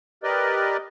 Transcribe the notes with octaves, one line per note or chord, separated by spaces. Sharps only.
G4 A#4 B4 D5 D#5